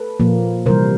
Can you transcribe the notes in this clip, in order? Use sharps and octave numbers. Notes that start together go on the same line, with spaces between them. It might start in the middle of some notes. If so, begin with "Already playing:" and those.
Already playing: A4 B4
A#2 F3 A#3
C3 E3 G3 A#4 C5